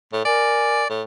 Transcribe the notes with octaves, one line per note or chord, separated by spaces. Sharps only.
A2
A#4 D5 G#5
A2